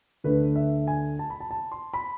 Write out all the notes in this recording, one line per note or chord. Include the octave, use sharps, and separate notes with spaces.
D2 D3 A3 D4 B4
E5
G#5
A5
B5
A5
A5
C6
B5